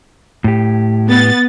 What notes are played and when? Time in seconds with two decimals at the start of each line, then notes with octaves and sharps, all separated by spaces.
0.44 A2 G4
1.09 B3 A6